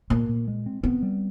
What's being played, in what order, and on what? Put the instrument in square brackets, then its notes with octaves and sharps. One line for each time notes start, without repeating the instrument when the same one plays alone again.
[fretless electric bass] A#2 [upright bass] A#3
[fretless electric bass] A#2
G#3
C4
[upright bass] B3 [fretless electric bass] C4
[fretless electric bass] G3